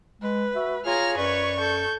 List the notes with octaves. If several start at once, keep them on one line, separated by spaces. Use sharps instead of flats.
G#3 B4
F#4 E5
F4 G#4 C#5 A#5 F6 A#6
F#2 B4 C#5 D5 C#6
A4 G6